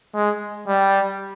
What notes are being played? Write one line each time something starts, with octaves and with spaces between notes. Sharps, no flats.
G#3
G3